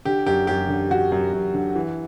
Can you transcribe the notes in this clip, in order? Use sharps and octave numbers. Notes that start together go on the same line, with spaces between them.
D3 G4
F#2 G4
F#2 G4
D3
D3 F#4
F#2
F#2
D3
E3